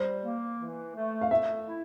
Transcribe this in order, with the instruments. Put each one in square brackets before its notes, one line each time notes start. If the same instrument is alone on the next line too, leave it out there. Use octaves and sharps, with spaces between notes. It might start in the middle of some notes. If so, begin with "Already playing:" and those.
Already playing: [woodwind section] G3 [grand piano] C5
[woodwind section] A#3
E3
A3
[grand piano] F5
[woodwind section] A3 [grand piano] E5
[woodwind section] E4